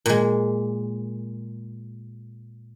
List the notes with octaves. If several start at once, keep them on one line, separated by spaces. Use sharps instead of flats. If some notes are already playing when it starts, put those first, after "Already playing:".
A#2 G#3